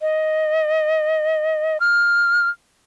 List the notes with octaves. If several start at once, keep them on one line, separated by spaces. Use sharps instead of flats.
D#5
F6